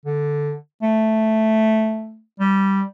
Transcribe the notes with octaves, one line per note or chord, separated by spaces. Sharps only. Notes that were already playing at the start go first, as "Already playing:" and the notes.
D3
A3
G3